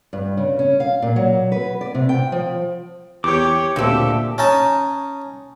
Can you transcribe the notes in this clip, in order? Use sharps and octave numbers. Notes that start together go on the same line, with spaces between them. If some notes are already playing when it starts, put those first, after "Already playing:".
G2
C#3
C#4
F5
A#2
F#3
B4
D5
C3
G5
F3
E2 G4 C#5 D6
D2 A#2 C4 G4 A4 E5
C#4 D#4 A5